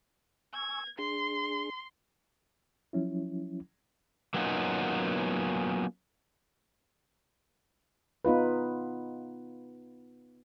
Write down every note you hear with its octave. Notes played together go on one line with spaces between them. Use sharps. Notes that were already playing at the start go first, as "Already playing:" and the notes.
G#5 C#6 E6 G#6
D4 G#4 C6
F3 F#3 C#4 E4
F#3 A#3 B3 C#4 D#4 F4
B3 D#4 F4 B4